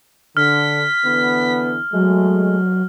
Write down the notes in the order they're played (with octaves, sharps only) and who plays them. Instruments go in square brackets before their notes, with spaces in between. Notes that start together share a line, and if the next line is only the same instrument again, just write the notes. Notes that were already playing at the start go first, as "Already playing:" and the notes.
[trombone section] D3 [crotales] F6 [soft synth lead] B6
[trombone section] D3 E3 B3
[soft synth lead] F#3 [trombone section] G#3 A3